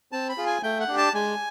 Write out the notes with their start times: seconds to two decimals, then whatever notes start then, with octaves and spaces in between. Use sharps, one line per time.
0.12 C4 A5
0.29 B5
0.38 F4 G#4
0.46 G#5
0.63 A3 G5
0.80 F#5
0.88 D4 G4
0.98 A5
1.14 G#3 G#5